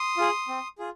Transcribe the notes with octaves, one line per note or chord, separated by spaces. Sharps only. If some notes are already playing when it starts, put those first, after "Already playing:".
Already playing: C6 D#6
F4 G#4
C4
F4 G#4